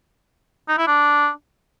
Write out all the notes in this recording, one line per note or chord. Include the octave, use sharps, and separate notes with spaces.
D#4
E4
D4